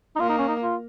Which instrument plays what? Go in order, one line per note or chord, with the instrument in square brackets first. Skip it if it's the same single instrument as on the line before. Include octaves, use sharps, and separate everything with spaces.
[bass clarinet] D#4
[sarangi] A#3 [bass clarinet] F4
[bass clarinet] D#4
C#4
D#4
F4